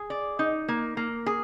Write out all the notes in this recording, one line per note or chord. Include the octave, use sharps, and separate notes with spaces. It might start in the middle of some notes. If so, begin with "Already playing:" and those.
Already playing: G#4
D5
D#4
A#3
A#3
G#4